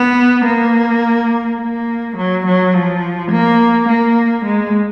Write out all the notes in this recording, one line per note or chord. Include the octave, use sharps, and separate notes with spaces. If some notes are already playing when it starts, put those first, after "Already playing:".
Already playing: B3
A#3
A#3
F#3
F#3
F3
A#3
A#3
G#3